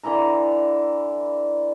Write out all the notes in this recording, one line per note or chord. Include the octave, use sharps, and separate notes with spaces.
D3 E3 E4 A#5